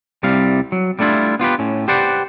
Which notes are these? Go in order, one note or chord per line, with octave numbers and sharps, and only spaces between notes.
C2 C3 G3 F5
F#3
G3 A3 D4 E4 F4
B3 F4 G4 B4
A2 C#4
G4 B4 C5 D5 F#5